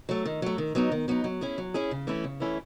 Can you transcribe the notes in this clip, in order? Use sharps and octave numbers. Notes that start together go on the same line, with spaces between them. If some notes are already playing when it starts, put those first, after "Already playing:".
F#3 A3
D#3
F#3 A3
D#3
F#3 B3 D#4
D#3
F#3 B3 D#4
F#3
C#4 E4 G#4
F#3
C#4 E4 G#4
C#3
E3 A3 C#4 E4
C#3
E3 A3 C#4 E4